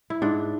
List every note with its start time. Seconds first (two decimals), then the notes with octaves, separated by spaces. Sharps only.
0.10 E4
0.22 G#2 D4